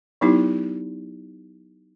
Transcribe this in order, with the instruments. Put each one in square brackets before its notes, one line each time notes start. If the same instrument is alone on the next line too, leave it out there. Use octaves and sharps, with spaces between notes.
[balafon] F#3 B3 D#4 E4 G4